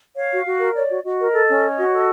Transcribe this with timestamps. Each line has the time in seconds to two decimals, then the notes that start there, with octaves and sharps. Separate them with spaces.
0.16 C#5 F5
0.31 F#4
0.45 F#4
0.60 A#4
0.74 C#5 D5
0.89 F#4
1.04 F#4 D#5
1.18 A#4
1.32 A4
1.48 C#4
1.63 C#5
1.77 F#4
1.92 A4